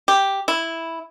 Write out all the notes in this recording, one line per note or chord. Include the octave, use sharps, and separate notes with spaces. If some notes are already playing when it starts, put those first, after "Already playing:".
G4
E4